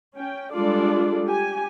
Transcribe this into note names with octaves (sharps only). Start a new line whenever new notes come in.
C#4 G5
G3 G#3 D4 F4 A4 D5
G4 G#5